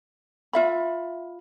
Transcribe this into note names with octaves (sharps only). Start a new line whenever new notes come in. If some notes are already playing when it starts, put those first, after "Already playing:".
F4 E5 B5